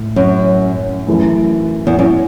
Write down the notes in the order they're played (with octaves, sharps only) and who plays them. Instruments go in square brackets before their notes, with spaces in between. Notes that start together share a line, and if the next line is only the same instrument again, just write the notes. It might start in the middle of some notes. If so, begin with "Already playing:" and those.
Already playing: [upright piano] A2
[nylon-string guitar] F#2
[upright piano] F#2 E3 A3
[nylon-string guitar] E2
F#2